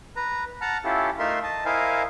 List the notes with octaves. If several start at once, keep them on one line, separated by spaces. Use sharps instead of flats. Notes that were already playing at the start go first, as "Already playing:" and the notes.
B4 A#5
F#5 A5 A#5 F6
C#4 E4 F4 G4 A4
A3 D#4 F4 A#4 E5 C6
D#5 A5
E4 A#4 C5 D#5 F5 G#5